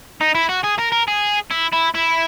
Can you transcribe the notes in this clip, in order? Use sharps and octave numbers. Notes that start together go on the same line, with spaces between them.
D#4
E4
F#4
G#4
A#4
A#4
G#4
E4
E4
E4